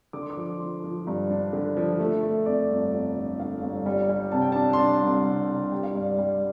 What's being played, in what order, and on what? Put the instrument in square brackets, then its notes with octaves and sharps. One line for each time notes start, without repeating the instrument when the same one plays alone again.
[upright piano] D3 D6
C6
D6
F3
F3 C6
F3
G2
D4
D3
F3
A3
A3
F2 D5
G1
F2
D3
D3 F5
G1
G3
G3
C3 A5
G5
D4 A5
C6
D4 A5
C2
C3
C3
G3 G5
F5
G2 D5
D5
G3